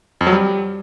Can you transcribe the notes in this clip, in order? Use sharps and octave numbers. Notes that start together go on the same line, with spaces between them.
F2
F#3
G3